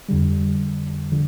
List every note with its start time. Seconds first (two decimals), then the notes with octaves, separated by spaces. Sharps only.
0.08 F2 D3 G3
1.12 D3 F3